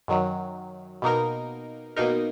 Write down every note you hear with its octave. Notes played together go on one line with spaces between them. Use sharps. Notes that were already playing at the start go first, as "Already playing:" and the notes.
F#2 D#3 F#3
B2 A#3 D#4 A#4
B2 A#3 D#4 A#4